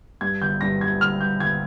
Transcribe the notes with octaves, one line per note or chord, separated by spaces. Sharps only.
G2 G#6
G1 G6
G2 A#6
G1 G#6
G1 F6
G3 G6
G1 G#6